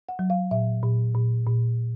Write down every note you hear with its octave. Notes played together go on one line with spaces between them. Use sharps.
F#5
F#3
F5
A#2 E5
A#2
A#2
A#2